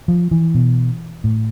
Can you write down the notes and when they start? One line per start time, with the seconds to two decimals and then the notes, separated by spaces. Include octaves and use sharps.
0.08 F3
0.31 E3
0.54 B2
1.24 A2